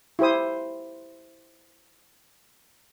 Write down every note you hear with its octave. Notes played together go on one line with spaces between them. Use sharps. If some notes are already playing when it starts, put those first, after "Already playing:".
E4 G4 C5 D#6